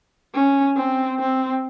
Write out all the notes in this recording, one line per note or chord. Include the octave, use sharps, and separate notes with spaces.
C#4
C4
C4